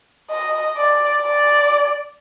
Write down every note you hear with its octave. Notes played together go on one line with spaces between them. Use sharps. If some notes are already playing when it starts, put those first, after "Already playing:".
D#5
D5
D5